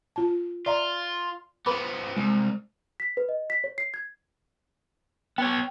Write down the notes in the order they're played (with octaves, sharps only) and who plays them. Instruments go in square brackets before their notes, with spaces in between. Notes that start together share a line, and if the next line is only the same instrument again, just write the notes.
[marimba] F4 A5
[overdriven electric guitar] F4 [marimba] D5 E5 A#5
[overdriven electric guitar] F3 B3 [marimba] B4 B5 D6
[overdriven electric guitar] C2 [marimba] G#3
[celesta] B6
B4
D#5
B6
C#5
C7
G#6
[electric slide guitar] B3 C#5 [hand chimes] G5